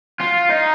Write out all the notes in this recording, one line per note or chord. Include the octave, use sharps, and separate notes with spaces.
F4
D#4